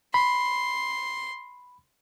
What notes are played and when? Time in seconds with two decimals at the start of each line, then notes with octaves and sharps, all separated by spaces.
0.14 B5 C6